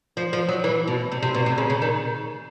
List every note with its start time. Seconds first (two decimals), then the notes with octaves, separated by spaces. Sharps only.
0.17 F3
0.33 F3
0.49 F#3
0.64 E3
0.88 B2
1.12 C3
1.23 C3
1.35 B2
1.46 C3
1.58 C#3
1.70 C#3
1.82 D#3